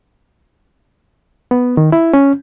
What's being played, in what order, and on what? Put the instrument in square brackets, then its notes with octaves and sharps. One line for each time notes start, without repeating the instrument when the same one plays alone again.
[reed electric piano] B3
D#3
E4
C#4